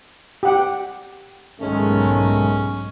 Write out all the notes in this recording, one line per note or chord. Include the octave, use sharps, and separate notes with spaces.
G4 F#5 G5
B1 G#2 D#3 G#3 A3 C#4